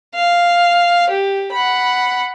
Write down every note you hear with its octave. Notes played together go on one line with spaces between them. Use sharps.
F5
G4
F#5 B5